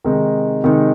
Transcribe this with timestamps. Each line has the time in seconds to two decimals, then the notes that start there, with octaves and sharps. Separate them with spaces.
0.04 C3 D#3 G#3 D#4
0.64 C3 D#3 G#3 D#4